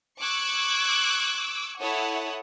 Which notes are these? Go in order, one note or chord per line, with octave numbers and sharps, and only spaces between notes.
C#6 D6 E6 F#6 G#6
E4 A4 C#5 F#5 D#6